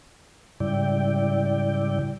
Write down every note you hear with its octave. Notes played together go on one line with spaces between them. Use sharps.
G#2 C#3 G3 E4 D5 G5